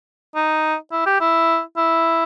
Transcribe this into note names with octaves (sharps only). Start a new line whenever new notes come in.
D#4
E4
G4
E4
E4